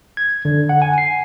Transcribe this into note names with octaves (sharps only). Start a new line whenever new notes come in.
G#6
D3
F#5
G#5
C7